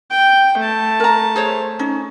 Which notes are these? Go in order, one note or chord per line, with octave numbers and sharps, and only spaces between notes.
G5
A3 A5
A#4 A#5
G#4 C5 C#5
C#4 D#4